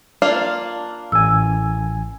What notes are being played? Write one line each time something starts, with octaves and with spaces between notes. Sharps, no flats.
A#3 D4 F4
A1 G#5 E6